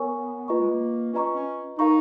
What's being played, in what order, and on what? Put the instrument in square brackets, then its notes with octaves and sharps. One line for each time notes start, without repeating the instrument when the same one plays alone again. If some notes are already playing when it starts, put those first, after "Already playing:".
Already playing: [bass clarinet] B3 [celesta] A#4 C#5 G#5 C#6
[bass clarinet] A#3 [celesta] F4 B4 D#5 A#5 C#6
[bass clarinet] G#3
A#3
[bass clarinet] C#4 [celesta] F4 B4 D#5 A#5 C#6
[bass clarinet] C#4
[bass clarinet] D#4 [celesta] A#4 F5 A#5 C#6